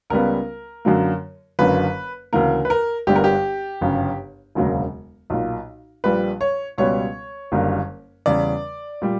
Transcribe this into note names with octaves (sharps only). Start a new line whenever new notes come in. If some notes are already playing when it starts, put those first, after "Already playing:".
C#2 C#3 G3 B3 A#4
F#2 D3 F#3 A#3
F#1 F#2 D3 F#3 A#3 B4
D2 C#3 E3 A#3 A#4
B4
A#4
G1 G2 D3 G3 B3 G4
A#4
G4
G1 F#2 C#3
E1 D2 C#3 F#3 A#3
B1 A#2 A#3
A#1 A#2 G3 B4
C#5
C#2 B2 G3 B3 C#5
F#1 F#2 D3 G3 A#3
E2 C#3 G3 D5
A#2 G3